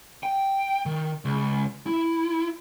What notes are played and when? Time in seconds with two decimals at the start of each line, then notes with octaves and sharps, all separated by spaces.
0.23 G5
0.86 D#3
1.25 C#2
1.87 E4